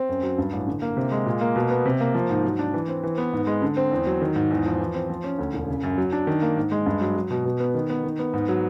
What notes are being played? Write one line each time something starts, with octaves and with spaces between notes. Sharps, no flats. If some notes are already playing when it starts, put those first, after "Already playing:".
Already playing: C4
F#2
F#3
G2
A1
D3
A#3
C3
G#3
A#2
A#3
B2
B3
C3
A#3
F3
G#2
F#3
D4
E3
C4
E3
B3
G#2
G#3
D3
C4
E2
F#3
D#3
G#2
E2
F3
E3
C4
F3
C#4
D2
E1
C#3
F#2
F#3
D4
D#3
A#3
G#2
G#3
G2
F#3
F#3
B2
B2
B3
D#3
B3
D#3
B3
G#2
F#3